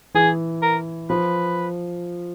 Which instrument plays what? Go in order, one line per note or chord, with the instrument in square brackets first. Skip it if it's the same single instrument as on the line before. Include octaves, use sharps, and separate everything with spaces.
[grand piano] E3 [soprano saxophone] G#4
[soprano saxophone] A#4
[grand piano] F3 [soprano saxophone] B4